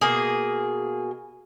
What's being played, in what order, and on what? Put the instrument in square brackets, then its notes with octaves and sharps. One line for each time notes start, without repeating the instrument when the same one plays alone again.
[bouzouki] B2 A#3 G#4